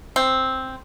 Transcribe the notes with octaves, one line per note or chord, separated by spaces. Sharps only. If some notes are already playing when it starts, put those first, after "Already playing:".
C4